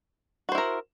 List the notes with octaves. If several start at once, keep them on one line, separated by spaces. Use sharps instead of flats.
E4 F#4 A#4 C5